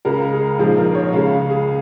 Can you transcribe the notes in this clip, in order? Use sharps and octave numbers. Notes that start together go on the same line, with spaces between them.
C#2 C#3 G#3 A#4
G#4
A#1 G#2 F3 G#3 G#4
A#4
C#5
C#2 C#3 G#3 F5
F5
G#4